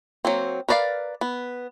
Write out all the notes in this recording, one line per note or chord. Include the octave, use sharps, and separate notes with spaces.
F#3 A#3 C4
A#4 B4 D5 D#5 F5
B3